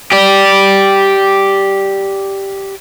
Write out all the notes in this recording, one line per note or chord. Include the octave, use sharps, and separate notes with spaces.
G4 D5